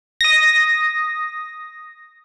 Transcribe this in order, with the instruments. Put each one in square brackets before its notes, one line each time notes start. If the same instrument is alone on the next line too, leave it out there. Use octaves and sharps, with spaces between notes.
[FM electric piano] D#6 A#6